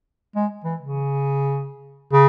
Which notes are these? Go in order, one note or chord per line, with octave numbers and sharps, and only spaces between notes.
G#3
E3
C#3
C#3